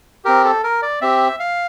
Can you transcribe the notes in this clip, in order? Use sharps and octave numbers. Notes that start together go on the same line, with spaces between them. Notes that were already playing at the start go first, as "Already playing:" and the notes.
C4 G4 A#4
A4
A#4
D5
C4 G4 E5
F5